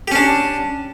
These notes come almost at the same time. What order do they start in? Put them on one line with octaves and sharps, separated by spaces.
G4 C#4 D4